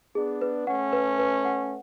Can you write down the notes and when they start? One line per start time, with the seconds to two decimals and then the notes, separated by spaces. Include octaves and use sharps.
0.15 B3 D4 G#4
0.41 B4
0.67 A3 C#4 F#5
0.93 B4
1.18 B4
1.45 F#5